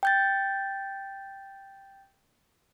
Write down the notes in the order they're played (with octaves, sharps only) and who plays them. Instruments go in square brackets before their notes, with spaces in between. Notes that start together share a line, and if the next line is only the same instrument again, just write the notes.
[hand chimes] G5 G6 A6